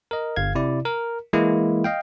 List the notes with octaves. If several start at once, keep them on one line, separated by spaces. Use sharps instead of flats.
A#4 D#5
G1 F5 G#6
C3 E4 D5
A#4
E3 G#3 A#3 E4
D#5 F5 G5